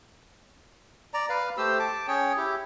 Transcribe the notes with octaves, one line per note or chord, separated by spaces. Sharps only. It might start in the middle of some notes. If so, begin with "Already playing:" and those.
D5 A#5
B4 F5
A3 G4 C5 E6
A5 D6
C#4 G#4 C#5 G5
E4 G4